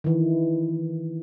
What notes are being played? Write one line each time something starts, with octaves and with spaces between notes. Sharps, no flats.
D#3 E3